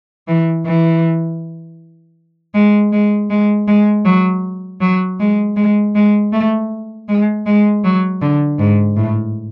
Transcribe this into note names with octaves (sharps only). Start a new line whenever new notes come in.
E3
E3
G#3
G#3
G#3
G#3
F#3
F#3
G#3
G#3
G#3
A3
G#3
G#3
F#3
D3
G#2
A2